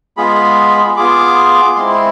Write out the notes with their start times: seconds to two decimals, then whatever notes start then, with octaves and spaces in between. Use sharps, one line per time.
0.17 G#3 B3 F4 G#4 B5
0.97 B3 F4 G#4 D6
1.76 G#3 C4 E4 C6
1.89 C6